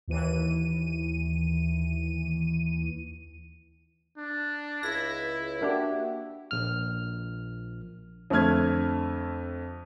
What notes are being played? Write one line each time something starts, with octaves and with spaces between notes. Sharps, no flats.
D#2 E3 D#7
D4
C#2 E4 A#6
A#3 D4 F#4 G4 E5
A#1 F6
F2 D3 A3 F6 G#6